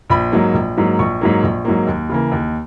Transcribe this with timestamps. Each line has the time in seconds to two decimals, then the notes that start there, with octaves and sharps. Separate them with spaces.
0.10 A#1 B5
0.32 G#2 F#3 A#3
0.54 A#1
0.77 G#2 F#3 A#3
0.99 A#1 C#6
1.21 G#2 F#3 A#3
1.43 A#1
1.65 G#2 F#3 A#3
1.87 D#2
2.09 C#3 E3 A#3
2.32 D#2